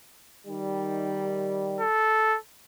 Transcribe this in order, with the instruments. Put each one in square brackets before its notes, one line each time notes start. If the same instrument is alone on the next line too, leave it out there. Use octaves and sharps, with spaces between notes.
[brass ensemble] D#3 G3
[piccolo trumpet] A4